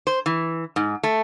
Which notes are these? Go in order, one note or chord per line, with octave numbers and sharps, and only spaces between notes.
C5
E3
G#2
A3